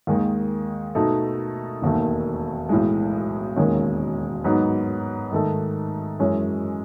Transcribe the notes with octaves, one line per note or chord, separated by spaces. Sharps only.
D#2 D#3 G#3
B2 A3 D#4 A4
E1 D#2 D#3 A3
B1 A2 E3 G#3
E1 D#2 D#3 G#3 C#4
G#2 F#3 B3 D#4
G#2 D#3 A3 D#4 A4
F#2 E3 G#3 C#4